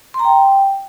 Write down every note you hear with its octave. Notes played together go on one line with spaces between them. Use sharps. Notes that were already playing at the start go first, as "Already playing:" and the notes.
C6
A#5
G5